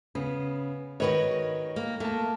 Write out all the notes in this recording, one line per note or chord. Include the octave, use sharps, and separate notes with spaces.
C#3 B3
D#3 D#4 F#4 A#4 B4 C#5
A#3
A3 A#3 A5